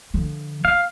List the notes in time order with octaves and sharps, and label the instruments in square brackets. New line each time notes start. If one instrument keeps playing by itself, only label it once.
[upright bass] D3 F3
[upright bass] A#3 [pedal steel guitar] F5